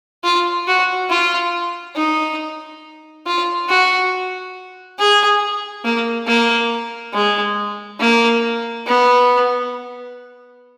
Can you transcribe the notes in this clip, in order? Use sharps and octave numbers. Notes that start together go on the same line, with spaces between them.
F4
F#4
F4
D#4
F4
F#4
G#4
A#3
A#3
G#3
A#3
B3